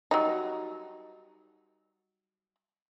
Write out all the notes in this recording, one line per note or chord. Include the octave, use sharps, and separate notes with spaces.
F#3 G3 D#4